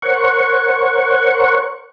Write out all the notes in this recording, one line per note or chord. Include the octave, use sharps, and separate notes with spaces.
A#4 C5 C#5 F#5 C#6